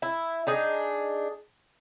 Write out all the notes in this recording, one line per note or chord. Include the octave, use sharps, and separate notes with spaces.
E4
D4 D#4 G#4